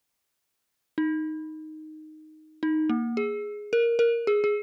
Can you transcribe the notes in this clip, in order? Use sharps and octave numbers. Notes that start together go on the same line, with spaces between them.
D#4
D#4
A#3
G#4
A#4
A#4
G#4
G#4